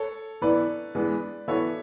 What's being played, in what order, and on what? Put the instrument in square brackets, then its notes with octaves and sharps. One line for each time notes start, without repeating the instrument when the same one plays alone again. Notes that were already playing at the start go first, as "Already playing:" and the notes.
Already playing: [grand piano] A4 C#5
[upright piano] E3 B3 E4 [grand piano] B4 D5
[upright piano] E3 G#3 B3 D4
[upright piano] E3 B3 F#4 A4 [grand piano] C#5 E5